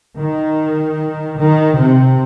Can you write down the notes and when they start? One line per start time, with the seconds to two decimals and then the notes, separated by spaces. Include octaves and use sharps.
0.19 D#3
1.39 D#3
1.78 C3